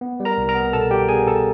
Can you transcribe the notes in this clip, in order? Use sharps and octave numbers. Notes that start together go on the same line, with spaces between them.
B3
G3
A#4 A#5
C2
A#4 A#5
B3
B2 A4 A5
G3 G4 G5
B3 G#4 G#5
B2 A4 A5